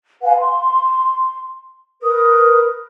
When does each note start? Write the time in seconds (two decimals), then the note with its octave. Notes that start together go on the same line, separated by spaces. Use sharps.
0.23 B4 F5 F#5 G#5
0.39 C6
2.03 A#4 B4 D#6